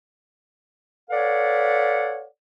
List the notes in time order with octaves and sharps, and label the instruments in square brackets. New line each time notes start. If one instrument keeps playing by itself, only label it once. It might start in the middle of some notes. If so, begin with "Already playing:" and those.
[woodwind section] A4 B4 C#5 D5 F5 F#5